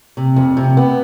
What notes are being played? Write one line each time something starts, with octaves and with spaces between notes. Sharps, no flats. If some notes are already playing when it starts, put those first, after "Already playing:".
C3
F2
C3
B3